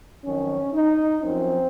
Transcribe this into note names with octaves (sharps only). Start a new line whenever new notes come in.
F2 D#3 F#3 C#4
D#4
F#2 F3 C4